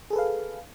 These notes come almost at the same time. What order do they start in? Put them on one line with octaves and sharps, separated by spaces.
G#4 A4 B4 F5